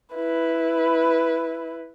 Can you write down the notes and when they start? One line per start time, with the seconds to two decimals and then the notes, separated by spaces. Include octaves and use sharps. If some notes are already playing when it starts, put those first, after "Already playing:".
0.14 E4 B4